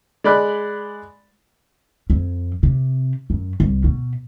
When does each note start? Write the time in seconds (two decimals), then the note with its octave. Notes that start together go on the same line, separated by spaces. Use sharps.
0.24 G#3 D5 B5 F#6
2.10 F2
2.63 C3
3.30 F#2
3.60 C2
3.84 B2